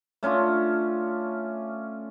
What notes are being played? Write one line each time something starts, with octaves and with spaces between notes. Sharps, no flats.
A3 C#4 D4 F4